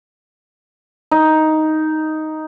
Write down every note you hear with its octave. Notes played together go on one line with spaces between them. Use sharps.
D#4